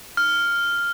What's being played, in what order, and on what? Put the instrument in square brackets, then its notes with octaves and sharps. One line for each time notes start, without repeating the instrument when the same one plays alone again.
[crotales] F6